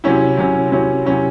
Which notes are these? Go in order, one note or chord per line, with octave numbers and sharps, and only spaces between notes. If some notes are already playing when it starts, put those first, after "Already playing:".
C3 F#3 C#4 E4
C3 F#3 C#4 E4
C3 F#3 C#4 E4
C3 F#3 C#4 E4